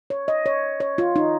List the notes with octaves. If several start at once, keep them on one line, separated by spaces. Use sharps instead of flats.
C#5
D#5
C#5
C#5
F4
D#4